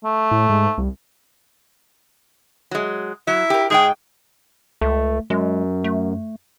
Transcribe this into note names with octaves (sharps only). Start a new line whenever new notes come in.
A3
A2
G#2
C2
F#3 G#3
F#3 E4
G4 A#4
G#2 G#3 G#4 G5
C#2 A3
F#2 G#3
A3